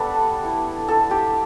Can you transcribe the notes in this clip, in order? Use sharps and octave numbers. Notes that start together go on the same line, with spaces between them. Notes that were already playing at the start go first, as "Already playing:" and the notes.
Already playing: G3 B3 D4 A4 B4 D5
A3 E4
A4
G4